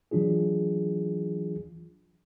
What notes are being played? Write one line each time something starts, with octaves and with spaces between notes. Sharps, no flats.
E3 F#3 D4 F4 G#4